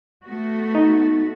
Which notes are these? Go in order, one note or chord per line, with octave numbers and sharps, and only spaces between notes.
A3 B3 F#4
D#4